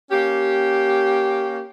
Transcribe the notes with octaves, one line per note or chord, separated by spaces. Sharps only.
A#3 C#4 G4